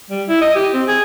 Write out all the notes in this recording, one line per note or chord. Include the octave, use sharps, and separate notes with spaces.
G3
E4
D#5
G4
C4
G#4